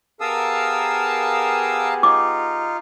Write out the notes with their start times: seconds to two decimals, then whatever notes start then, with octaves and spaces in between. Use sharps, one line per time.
0.21 B3 G4 G#4 A#4 F5 A5 D#6 E6
2.03 D#4 F4 D6